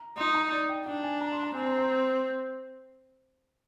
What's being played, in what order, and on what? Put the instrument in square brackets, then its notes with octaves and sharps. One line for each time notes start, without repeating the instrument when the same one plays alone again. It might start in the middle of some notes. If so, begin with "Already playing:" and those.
Already playing: [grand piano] A#5
[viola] D#4 [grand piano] C6
[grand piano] A#5
D5
G5
[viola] D4 [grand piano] G5
[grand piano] G#5
A#5
C6
A#5
[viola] C4 [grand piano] G#5
[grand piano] A#5
A#5